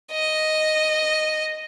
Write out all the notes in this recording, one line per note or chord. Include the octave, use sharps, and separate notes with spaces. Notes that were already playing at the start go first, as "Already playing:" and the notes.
D#5